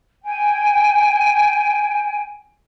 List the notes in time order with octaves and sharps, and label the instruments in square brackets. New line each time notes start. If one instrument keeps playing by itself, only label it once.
[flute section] G5 G#5